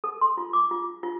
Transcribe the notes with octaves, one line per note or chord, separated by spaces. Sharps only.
A4
C6
F4
D6
F4
F4